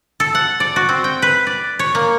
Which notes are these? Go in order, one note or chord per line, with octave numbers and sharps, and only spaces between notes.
A4
F#5
D5
F#4
C4
G5
B4
D5
C#5
A#3